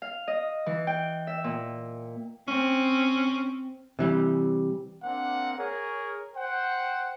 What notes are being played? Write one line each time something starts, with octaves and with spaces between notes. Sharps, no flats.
F5
D#5
E3
G5
E5
A#2
C4 C#4
C3 E3 G3
A#3 C4 D4 F#5
G#4 A#4 C#5
C5 F#5 G5